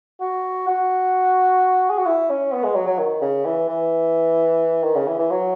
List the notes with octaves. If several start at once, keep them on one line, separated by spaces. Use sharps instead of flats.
F#4
F#4
G#4
F#4
E4
C#4
B3
G#3
F#3
F#3
D#3
C#3
E3
E3
D#3
C#3
E3
E3
F#3